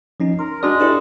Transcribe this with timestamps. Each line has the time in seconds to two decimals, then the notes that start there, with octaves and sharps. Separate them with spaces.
0.20 F3 C#4 D#4
0.39 A#4 C6
0.63 G#3 D4 F#4 D5
0.80 D4 E4 G4 A4 B4 D5